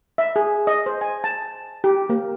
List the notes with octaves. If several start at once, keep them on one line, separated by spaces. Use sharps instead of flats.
E5
G#4
D#5
C5
G#5
A5
G4
A#3